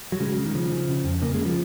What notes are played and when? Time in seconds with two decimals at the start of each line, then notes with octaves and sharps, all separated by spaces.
0.12 F#3
0.20 C#3 G#3
0.38 C#3
0.46 D#3
0.55 C#3 F3
0.72 C#3
0.89 C#3
1.05 F2
1.22 C#3 A#3
1.34 G#3
1.39 C#3
1.45 F3